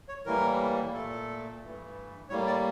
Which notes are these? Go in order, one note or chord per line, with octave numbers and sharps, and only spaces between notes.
C#5
A2 E3 G3 A#3 A#4
A#2 A3 A4
G2 E3 A3
A2 G3 A#3 C#5
D5